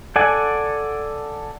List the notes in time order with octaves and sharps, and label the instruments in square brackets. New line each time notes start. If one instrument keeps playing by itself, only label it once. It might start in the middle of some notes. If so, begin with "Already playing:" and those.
[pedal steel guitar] A4 D5 F#5 G#5